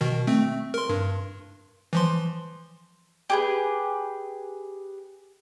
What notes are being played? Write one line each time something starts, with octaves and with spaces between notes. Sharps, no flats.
B2 D#3
A3 C4
A#4 C6
G2
E3 F3 C6
G4 G#4 B4